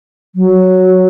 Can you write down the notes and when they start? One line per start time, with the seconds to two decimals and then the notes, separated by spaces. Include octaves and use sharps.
0.35 F#3